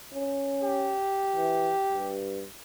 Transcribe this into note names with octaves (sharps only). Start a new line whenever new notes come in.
C#4
G4
E3
G2